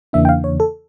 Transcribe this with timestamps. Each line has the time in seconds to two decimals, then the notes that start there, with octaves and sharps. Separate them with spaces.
0.13 E2 C#3 E3 A#3 D4 E5
0.25 G5
0.29 F5
0.44 C#5
0.60 A4